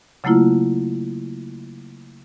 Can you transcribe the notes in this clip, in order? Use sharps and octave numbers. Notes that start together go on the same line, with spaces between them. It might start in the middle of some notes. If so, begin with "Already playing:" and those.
C#3 F#3 A3 A#3 E4 F4